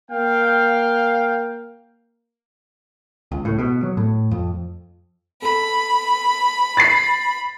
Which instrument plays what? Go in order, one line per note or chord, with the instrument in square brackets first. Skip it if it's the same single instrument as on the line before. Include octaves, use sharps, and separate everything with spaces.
[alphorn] A#3 [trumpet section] F5 G5
[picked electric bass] C#2
A2
B2
F#3
A2
F2
[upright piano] A4 [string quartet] B5
[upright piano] A6 C7